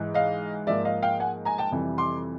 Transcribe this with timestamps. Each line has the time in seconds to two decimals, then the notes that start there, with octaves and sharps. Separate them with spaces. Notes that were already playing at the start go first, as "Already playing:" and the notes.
Already playing: G#2 E3 G#3
0.14 D#5 F5
0.67 G#2 F3 A#3 D5 E5
0.85 D#5 F5
1.03 F5 G5
1.20 F#5 G#5
1.45 G#5 A#5
1.58 G5 A5
1.72 F2 C3 E3 G3
1.98 C6 D6